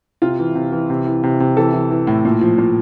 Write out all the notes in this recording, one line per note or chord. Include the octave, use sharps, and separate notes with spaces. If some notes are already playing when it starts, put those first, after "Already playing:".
C3 F4
E3
C3
E3
C3
E3
C3
C3
E3 A4
E3
E3
A2
A#2
F3
A#2